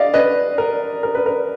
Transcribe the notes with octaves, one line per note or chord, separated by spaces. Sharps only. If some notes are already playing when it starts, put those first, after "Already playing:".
Already playing: D5 D#5 F5
B4 D#5
A#4
A#4
B4
A#4